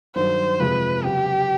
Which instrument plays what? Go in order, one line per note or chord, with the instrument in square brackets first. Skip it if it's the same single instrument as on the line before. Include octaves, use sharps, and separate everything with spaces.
[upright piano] G2 D#3 F#3 [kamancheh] C5
[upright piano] F2 C3 F3 G#3 [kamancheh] B4
[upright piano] C#3 F#3 B3 [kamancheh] G4